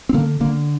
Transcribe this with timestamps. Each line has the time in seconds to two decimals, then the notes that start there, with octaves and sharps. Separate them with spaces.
0.09 C4
0.14 D3 A#3
0.40 D3 A#3